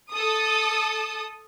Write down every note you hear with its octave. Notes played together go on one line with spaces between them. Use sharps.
A4 D#6